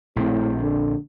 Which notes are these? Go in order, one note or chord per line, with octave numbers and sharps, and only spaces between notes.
A#1 A2 C4
D3